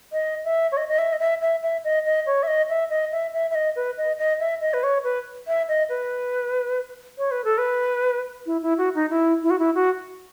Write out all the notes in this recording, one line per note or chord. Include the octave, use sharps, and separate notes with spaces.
D#5
E5
C#5
D#5
D#5
E5
D#5
E5
E5
E5
D#5
D#5
C#5
E5
D#5
E5
D#5
E5
E5
E5
D#5
B4
D#5
D#5
E5
D#5
B4
C#5
B4
E5
D#5
B4
C#5
B4
A4
B4
E4
E4
F#4
D#4
E4
E4
F#4
E4
F#4